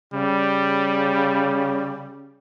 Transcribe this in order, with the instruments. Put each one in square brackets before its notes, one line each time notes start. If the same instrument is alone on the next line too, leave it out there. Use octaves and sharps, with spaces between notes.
[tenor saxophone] C#3 [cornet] G3